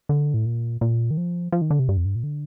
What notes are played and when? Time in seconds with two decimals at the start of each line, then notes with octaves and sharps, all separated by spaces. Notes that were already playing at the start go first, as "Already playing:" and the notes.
0.09 D3
0.34 A2
0.45 A#2
0.81 A#2
1.11 D#3
1.17 F3
1.52 F3
1.61 D#3
1.70 D3
1.79 C3
1.89 G2
1.97 F2
2.05 G2
2.15 A#2
2.23 D3